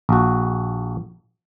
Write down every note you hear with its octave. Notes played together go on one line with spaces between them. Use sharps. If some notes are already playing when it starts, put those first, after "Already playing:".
A#1 F#4